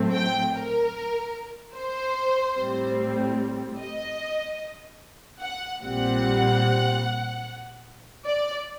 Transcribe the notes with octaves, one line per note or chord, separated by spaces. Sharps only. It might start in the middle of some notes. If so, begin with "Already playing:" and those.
Already playing: A2 F#3 A3 C4
G5
A#4
C5
A2 G3 C4
D#5
F#5
A#1 A#2 G3 C4 F#5
D5